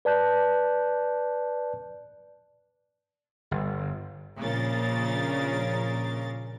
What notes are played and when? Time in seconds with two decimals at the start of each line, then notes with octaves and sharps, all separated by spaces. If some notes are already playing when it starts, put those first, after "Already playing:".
0.05 B4 D5 A5 F#6 G6
3.51 G1
4.38 A#1 A#2 C#3 A#4 A6